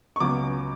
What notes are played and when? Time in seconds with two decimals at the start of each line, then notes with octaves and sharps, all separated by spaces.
0.16 C#6
0.20 C#2 C#3 F#3 B3 D6